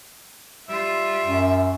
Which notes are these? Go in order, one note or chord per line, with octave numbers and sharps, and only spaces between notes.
G3 F4 E5
F#2